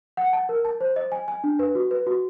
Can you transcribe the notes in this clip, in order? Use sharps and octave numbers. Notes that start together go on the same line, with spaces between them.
F#5
A5
A#4
A5
C5
D#5
G#5
G#5
D4
B4
F#4
B4
F#4